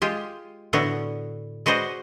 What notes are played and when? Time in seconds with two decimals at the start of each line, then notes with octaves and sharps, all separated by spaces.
0.02 G#3 F4 G4
0.73 A2 D3 A3 B3 F#4
1.66 G#3 F#4 B4 C5 D5 D#5